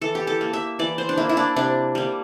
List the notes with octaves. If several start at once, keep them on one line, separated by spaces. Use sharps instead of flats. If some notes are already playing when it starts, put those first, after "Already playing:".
E3 A4
G4
A4
A#3
E5
E3 D5
C5
D4
A#3 E4
E4
D4
C3 D4
G3 A#3